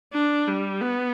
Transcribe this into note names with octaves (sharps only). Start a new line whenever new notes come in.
D4
G3
B3